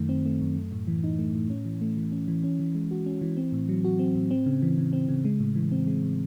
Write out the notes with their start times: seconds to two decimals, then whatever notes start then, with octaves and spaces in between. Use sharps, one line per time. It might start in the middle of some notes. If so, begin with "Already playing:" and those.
Already playing: F#2 D#3 A3
0.09 C4
0.26 A3
0.41 F#2
0.57 A3
0.72 A2
0.87 E3
1.04 D#4
1.18 A3
1.35 A2
1.50 C#4
1.65 E3
1.81 A3
1.97 E3
2.12 C#4
2.28 E3
2.44 C#4
2.60 E3
2.75 G#3
2.91 F#4
3.06 C#4
3.22 E3
3.37 C4
3.52 A2
3.69 F#3
3.85 F#4
3.99 C4
4.15 A2
4.31 C4
4.46 C#3
4.62 E3
4.78 C#3
4.93 C4
5.09 C#3
5.25 G#3
5.40 A2
5.56 E3
5.72 C4
5.87 G#3
6.03 A2